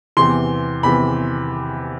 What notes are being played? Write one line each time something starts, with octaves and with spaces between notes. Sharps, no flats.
E2 C3 E3 C6
E2 C3 E3 B5